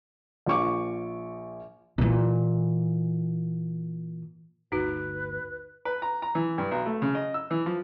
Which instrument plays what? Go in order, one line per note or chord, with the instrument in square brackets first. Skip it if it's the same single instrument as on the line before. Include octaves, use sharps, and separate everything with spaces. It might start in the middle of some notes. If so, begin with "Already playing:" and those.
[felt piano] A#1 F3 C#6 D6
[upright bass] A#2 E3
[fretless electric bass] G1 D2 [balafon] D#4 F#4 [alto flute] B4
[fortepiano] B4
A#5
A#5
E3
G2
B1
A3
C#3
D#5
E6
E3
F3